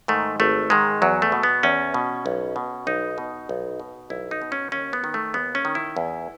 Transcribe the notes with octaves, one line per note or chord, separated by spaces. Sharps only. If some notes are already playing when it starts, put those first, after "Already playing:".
G#2 D#3 A3
G#1 A3
G#2 D#3 G#3
E2 F#3
A3
B2
B3
E2 C#4
B2
B1
B2
B1 D#4
B2
B1
B2
B1 E4
D#4
B2
C#4
D#2 C#4
B3
D#3
A3
D#2 B3
C#4
D#3
E4
E2